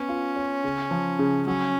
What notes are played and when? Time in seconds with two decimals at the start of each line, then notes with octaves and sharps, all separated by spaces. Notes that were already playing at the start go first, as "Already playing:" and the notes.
Already playing: B3 C#4
0.09 F4
0.36 C#5
0.64 C#3
0.91 F3
1.19 C#3
1.47 F#3 C#4